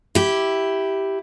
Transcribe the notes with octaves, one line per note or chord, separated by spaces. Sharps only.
E4 G4